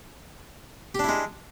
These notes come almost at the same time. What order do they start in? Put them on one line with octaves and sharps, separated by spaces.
G4 D4 E4 G#3